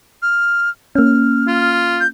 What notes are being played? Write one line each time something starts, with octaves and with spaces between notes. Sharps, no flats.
F6
A#3 C#4 F6
F4
G6